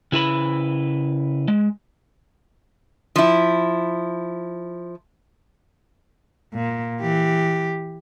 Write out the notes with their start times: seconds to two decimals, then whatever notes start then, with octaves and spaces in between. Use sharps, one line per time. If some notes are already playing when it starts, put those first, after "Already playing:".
0.12 C#3 E4 B4 B5
1.48 G#3
3.16 F3 E4
6.54 A#2
7.00 E3 G4